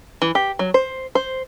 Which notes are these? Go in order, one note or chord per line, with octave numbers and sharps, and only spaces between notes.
E3
G4
F#3
C5
C5